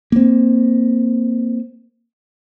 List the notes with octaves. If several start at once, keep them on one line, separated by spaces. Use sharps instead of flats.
A#3 C4